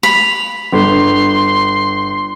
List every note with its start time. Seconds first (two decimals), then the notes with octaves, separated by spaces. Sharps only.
0.03 B5 F7
0.72 G1 C6